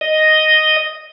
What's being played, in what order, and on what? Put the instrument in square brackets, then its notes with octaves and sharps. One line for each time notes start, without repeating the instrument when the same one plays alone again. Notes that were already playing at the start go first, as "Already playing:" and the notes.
[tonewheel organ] D#5